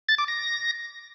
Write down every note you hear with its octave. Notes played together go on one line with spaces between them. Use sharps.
A6
D6
A#6